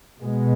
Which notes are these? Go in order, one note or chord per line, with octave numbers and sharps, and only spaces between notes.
B2 G#3 B3